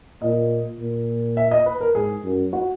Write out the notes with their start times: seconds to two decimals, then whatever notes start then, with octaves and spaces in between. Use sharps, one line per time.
0.22 A#2 D#5
0.80 A#2
1.37 E5
1.51 D#5
1.66 B4
1.81 A#4
1.95 G#2 G#4
2.24 F#2
2.53 F#4